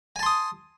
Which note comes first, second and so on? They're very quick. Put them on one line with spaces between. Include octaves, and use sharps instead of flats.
G#5 A5 C6 D#6